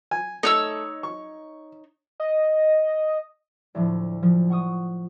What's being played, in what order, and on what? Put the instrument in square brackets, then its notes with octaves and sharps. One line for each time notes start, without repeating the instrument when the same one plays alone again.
[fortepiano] G#5
[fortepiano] A3 [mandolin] D#4 C#5 E6
[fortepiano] C#6
[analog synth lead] D#5
[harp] D2 A2 F3
F3
F#5 C#6 D#6